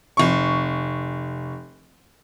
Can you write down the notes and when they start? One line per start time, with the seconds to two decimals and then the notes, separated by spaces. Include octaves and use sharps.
0.17 F1 C#6